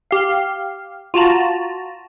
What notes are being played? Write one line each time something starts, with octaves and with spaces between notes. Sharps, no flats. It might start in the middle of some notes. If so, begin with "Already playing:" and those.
G4 F5
F4 F#4 A5 A#5